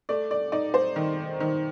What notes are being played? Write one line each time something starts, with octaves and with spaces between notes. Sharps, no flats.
A3 D5
D5
D#4 D5
C5
D#3
D#3